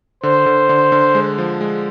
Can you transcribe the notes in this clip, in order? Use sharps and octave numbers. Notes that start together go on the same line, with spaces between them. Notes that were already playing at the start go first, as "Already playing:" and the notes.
D3 C5
D3
D3
D3
G#3
F3
G#3